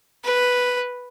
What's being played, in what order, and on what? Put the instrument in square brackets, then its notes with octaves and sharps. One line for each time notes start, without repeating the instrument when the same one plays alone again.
[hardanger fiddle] B4